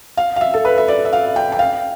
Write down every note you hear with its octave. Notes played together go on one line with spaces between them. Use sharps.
F5
F5
E5
A4
B4
E5
D5
E5
F5
G5
G5
F5